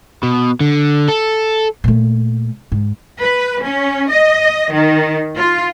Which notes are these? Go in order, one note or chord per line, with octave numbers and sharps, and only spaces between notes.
B2
D3
A4
A#2 A3
G#2
B4
C#4
D#5
D#3
F4